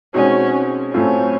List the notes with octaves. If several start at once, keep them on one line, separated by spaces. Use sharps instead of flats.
B2 G#3 C4 C#4 D#4 F#4
A2 F#3 A3 C4 C#4 F4